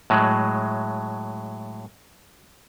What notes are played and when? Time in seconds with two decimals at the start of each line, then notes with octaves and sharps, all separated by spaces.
0.10 A2 F#3 G#3